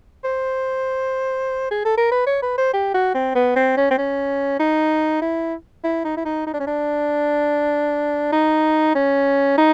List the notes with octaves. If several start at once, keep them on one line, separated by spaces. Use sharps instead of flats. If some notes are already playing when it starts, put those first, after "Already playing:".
C5
G#4
A4
A#4
B4
C#5
B4
C5
G4
F#4
C4
B3
C4
C#4
C4
C#4
D#4
E4
E4
D#4
E4
D#4
D#4
D4
C#4
D4
D#4
C#4
D#4